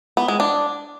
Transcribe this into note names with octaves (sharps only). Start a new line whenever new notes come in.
B3
G#3
D4